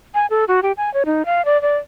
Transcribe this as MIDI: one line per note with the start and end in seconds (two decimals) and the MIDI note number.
0.15 0.26 80
0.30 0.44 69
0.48 0.60 66
0.63 0.72 67
0.77 0.92 80
0.94 1.03 73
1.06 1.25 63
1.26 1.45 77
1.45 1.60 74
1.62 1.77 74